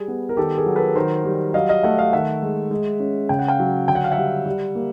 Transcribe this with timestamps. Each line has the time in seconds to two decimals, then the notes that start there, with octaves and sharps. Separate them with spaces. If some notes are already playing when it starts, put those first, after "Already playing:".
Already playing: G3 G#4
0.08 B3
0.29 A#4
0.37 D#3 G4 A4
0.57 G#4 A#4
0.66 F#3
0.76 A4 B4
0.95 D#3 A#4 C5
1.25 G3
1.54 F#3 D#5 F5
1.69 D#5 F5
1.83 A3 E5 F#5
1.98 D#5 F5
2.13 D#3 E5 F#5
2.43 G#3
2.71 G#3
3.00 C#4
3.29 C#3 G5
3.39 F#5
3.48 F5 G5
3.59 F#3
3.88 D3 G5
3.95 F#5
4.04 F5
4.12 E5 F#5
4.18 G3
4.46 G3
4.75 A#3